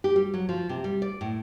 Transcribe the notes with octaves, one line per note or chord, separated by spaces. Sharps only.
G4
G3
F#3
F3
C3
G3
D5
A2